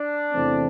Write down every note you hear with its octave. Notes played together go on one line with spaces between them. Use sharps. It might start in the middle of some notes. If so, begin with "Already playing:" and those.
Already playing: D4
E2 C3 E3 A3 C4